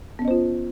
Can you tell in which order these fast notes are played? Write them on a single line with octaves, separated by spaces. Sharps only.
B3 C#4 D#5 C5 F4